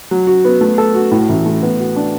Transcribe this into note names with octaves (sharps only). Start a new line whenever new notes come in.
F#3
F#4
B3
A3
A4
F#4
A2
A1
A3
B3
F#4
D4